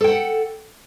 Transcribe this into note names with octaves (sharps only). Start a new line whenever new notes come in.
A4 F#5 G5